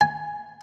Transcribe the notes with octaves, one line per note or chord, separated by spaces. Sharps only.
G#5